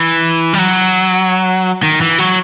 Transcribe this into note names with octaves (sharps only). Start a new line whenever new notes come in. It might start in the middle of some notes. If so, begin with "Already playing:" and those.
Already playing: E3
G3
F#3
D#3
E3
F#3